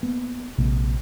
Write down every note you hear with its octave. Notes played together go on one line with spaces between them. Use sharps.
A#3 B3
A#1 C3 G#3 A#3